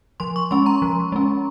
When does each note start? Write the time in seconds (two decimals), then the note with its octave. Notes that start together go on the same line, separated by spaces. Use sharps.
0.20 F3 C6
0.36 C#6
0.51 G#3 C#4 C6
0.66 A#5
0.82 F3
1.12 G#3 C#4